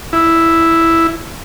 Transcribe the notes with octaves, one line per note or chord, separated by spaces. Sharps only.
E4